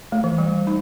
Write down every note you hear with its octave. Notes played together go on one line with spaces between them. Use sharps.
A3
E3
G3
D#4